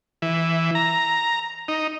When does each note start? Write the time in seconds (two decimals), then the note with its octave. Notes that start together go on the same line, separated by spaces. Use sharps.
0.22 E3
0.75 A#5
1.68 D#4